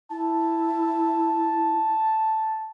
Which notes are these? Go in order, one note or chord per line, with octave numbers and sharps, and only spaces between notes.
E4 A5